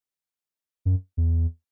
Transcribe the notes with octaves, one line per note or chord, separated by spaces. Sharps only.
F#2
E2